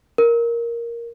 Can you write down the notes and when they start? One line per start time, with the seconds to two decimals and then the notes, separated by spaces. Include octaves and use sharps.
0.18 A#4